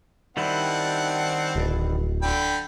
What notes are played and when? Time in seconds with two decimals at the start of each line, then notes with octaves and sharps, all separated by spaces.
0.37 D#3 G3 C4 D4 E4 F#5
1.56 D1
2.22 D3 G5 B5